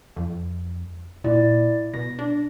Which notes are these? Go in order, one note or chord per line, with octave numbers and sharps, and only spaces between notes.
F2
A#2 E4 D5
B2 A#6
D4